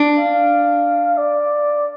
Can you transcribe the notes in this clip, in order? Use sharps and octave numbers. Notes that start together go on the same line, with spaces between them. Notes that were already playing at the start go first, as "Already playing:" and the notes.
Already playing: D4
F5
D5